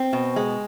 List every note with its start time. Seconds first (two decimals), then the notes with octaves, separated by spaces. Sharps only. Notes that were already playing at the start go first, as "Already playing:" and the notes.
Already playing: C4
0.13 B2
0.36 G#3